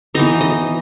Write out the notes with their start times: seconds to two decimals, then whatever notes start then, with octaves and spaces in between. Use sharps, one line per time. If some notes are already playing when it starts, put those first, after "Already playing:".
0.15 E3 B3 D#4 D#5
0.41 D#5